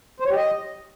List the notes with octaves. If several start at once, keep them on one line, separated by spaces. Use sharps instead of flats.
C5
C#5
G4
D#5